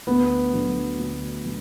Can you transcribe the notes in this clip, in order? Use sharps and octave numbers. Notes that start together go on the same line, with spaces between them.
D2 B3
D3 F#3
D2
F#3